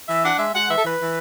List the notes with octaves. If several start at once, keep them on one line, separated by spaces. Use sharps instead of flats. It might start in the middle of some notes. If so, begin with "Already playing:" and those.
E3 E5
D4 F#5
G#3 E5
G#3 F#5
E3 E5
A4
E3 B4
E3